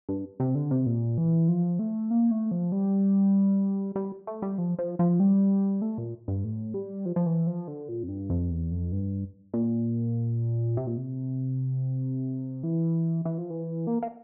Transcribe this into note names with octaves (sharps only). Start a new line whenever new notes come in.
G2
C3
D3
C3
A#2
E3
F3
A3
A#3
A3
F3
G3
G3
A3
G3
F3
F3
F3
G3
A3
A#2
G2
A2
G3
F3
F3
E3
F3
D3
A#2
F2
G2
F2
E2
F2
G2
A#2
C3
A#2
C3
E3
E3
F3
E3
A#3
A#3